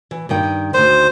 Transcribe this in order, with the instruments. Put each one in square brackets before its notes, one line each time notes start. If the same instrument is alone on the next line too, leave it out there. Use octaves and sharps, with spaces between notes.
[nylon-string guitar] E3
G2 D#3 G5
[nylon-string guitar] D2 D#3 [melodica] C5